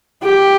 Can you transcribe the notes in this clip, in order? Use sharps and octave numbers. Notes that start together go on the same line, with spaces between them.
G4